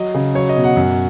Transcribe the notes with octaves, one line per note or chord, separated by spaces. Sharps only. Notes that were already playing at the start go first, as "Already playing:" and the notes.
Already playing: F#3 D#5
C#3
F#3 C#5
D#5
B2
F#5
F#2